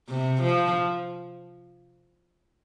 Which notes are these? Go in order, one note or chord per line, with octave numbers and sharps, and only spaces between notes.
C3
F3